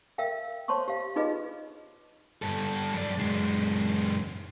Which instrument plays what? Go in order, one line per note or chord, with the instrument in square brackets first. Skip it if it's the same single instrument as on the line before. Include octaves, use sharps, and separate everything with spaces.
[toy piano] A#4 E5 F5 G5
C5 C#5 A5 C6 C#6
G4 F5
D#4 F4 G#4 B4 D#5
[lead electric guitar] G2 A4
F#2 D5
F#2 G#3